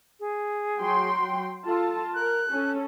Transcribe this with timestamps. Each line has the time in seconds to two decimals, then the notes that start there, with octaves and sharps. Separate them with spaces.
0.20 G#4
0.80 F#3 G5 C6
1.66 F4 A4 A5
2.15 A#4 F#6
2.50 C#4 A4